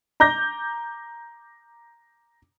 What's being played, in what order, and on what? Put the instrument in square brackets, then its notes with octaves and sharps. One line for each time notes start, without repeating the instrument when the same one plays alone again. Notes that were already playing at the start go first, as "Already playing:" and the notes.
[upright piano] A#5 D6 G6 A#6